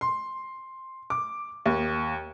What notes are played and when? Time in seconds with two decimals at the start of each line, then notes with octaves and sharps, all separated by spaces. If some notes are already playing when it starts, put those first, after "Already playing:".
0.01 C6
1.10 D6
1.66 D#2